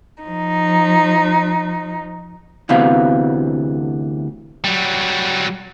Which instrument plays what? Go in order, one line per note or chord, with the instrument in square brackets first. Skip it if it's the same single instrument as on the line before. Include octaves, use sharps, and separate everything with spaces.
[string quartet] F3 D#4
[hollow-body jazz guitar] D2 C3 E3 B3 F5
[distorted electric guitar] F#3 G3